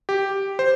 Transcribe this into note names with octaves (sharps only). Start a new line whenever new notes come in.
G4
C5